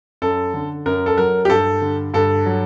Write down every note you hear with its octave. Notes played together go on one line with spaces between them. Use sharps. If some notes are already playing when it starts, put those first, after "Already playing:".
F#2 A4
D3
F#2 A#4
A4
F#3 A#4
G4
G2 A4
D3
G2 A4
F#3